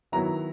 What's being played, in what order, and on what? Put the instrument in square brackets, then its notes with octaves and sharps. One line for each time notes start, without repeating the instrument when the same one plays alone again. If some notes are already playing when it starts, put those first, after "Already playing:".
[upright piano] D#3 F#3 B3 E4 A#5